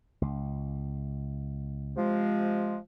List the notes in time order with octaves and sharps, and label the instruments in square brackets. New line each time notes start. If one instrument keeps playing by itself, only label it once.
[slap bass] C#2
[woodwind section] C3 F3 G#3